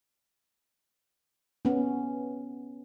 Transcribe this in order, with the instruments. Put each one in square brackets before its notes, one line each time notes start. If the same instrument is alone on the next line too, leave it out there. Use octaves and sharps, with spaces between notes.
[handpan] B3 C#4